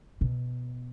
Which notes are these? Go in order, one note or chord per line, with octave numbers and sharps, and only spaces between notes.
B2